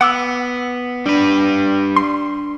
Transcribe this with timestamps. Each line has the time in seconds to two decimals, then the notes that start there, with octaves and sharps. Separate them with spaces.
0.01 B3 F#5 D6 E6
1.06 G3 D4 B4
1.96 C6